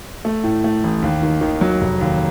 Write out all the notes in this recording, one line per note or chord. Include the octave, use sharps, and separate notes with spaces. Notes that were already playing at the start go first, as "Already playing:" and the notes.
A3
A2
A3
A1
D#2
D#3
D#3
F#3
F1
D#2